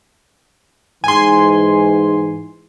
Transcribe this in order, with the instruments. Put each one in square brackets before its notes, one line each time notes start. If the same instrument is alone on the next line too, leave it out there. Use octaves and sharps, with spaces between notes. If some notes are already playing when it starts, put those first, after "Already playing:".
[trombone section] G#2 E3 [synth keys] G#5 C6